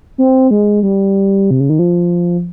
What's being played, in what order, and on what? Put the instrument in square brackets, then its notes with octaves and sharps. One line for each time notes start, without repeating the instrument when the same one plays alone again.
[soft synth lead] C4
G#3
G3
C3
C#3
D#3
F3